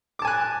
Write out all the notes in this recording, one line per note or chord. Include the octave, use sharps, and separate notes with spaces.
G#5 A5 D6 F#6